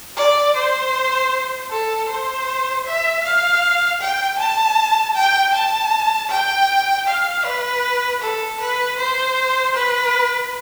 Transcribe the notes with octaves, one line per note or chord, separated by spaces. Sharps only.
D5
C5
A4
C5
E5
F5
G5
A5
G5
A5
G5
F5
B4
A4
B4
C5
B4